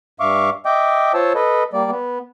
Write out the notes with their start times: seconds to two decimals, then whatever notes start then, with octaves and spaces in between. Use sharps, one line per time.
0.20 G2 E5 F5 C#6 D6
0.66 D#5 E5 G5 D6
1.14 F4 C5 C#5 A5 E6
1.35 A4 B4 D#5
1.73 G3 A#3 D5
1.91 B3